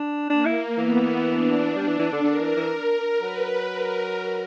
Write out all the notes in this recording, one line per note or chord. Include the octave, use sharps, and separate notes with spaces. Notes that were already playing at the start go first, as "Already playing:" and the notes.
Already playing: D4
A#3 D4
E4
E3 B3
D4
G3
E3
E3
D3
D3 A#4
E3
E3
F#3 B4
A#4